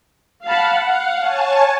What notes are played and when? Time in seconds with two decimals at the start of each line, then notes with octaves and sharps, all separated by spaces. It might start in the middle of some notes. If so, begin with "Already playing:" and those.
0.45 F5 F#5 A5 B5
0.86 F5
1.19 C#5 G#5 A5